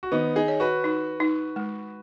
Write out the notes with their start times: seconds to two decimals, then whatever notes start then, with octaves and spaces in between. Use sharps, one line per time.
0.03 F#4
0.12 D#3 B3 D#4
0.36 D#4 G#4
0.48 C#5
0.60 F#4 B4
0.84 D#4
1.20 D#4
1.56 G#3